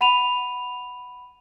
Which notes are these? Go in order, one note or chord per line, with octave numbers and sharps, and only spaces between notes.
F#5 B5 D#7 F7